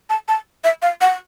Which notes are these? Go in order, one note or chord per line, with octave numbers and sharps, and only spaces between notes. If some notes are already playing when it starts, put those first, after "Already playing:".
A5
A5
E5
F5
F#5